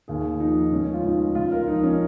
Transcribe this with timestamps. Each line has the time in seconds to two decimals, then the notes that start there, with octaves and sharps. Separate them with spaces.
0.08 D#2 G#4
0.40 F3 D#4
0.72 C#2 C#4
0.94 F4
1.04 C#2 D#4
1.35 C#2 F4
1.52 A#4
1.68 F3 D#4
1.83 C#4